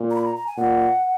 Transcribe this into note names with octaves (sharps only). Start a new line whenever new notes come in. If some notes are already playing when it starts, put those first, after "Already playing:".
Already playing: A#2
A#5
B5
A#5
A#5
G#5
A#2 F#5